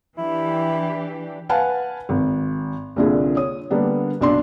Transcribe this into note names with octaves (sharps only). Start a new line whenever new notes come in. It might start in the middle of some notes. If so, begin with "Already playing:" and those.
E3 D4 E4 G4
B4 F5 F#5 G#5 A5
G#1
C2 A#2 D3 F4 G#4
C#5 D#6
D3 G3 A#3 B3 D4
B1 D4 C6